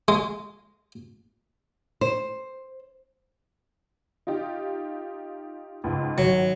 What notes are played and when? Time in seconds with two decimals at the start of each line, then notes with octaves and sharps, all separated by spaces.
0.08 G#3
2.01 C5
4.27 D#4 F4 G4
5.84 C#2 G#2
6.18 G#1 F#3